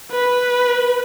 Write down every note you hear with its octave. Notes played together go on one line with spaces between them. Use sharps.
B4